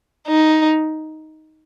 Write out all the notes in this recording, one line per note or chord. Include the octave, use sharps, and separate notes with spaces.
D#4